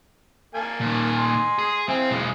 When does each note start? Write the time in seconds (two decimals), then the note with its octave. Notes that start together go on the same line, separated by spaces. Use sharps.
0.55 A#3 G#5 A5
0.81 A#2 D#3
1.17 G#5 C6
1.58 G#4
1.89 C4 E4 F5 G#5
2.11 B1 G#3